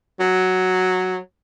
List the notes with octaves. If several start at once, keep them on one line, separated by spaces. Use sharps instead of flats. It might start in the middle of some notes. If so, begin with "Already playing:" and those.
F#3